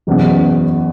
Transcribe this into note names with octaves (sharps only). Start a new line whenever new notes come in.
F#1 E2 B2